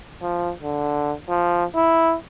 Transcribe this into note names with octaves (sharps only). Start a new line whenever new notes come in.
F3
D3
F3
E4